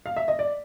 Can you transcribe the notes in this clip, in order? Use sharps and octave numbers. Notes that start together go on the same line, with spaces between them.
F5
E5
D#5
D5